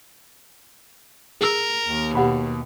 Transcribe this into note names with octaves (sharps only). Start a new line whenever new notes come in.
G#4 A#4 E6
D#2
B2 G4 F#5 B5